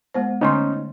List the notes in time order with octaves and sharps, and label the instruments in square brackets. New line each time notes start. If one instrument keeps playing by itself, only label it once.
[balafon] G#3 B3 C5
[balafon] D3 A3 C6 [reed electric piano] C#4 D#4